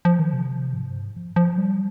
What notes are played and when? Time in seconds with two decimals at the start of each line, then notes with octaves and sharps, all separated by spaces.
0.05 F3
0.19 D#3
0.33 C3
0.74 G#2
0.88 G2
1.02 G#2
1.17 F3
1.36 F3
1.58 G3